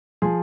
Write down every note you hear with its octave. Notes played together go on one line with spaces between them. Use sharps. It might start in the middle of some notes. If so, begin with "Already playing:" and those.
F3 G#4